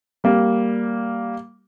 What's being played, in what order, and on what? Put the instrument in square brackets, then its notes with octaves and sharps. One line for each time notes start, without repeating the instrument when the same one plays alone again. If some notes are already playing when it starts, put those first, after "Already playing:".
[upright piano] G3 A#3